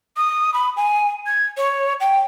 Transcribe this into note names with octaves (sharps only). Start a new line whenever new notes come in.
D#6
B5
G#5
G#6
C#5
G5